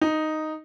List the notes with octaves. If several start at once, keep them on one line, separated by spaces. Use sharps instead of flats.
D#4